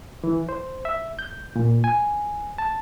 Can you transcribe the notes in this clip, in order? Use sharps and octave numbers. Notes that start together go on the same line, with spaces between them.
E3
C5
E5
G6
A#2
G#5
A5